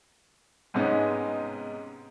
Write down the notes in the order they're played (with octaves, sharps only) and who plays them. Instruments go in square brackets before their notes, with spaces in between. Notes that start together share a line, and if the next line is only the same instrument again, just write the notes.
[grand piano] G#2 C3 G#3 B3 C#4 D#4